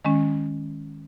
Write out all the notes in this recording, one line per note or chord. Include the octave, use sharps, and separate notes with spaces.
D#3 G#3 C#4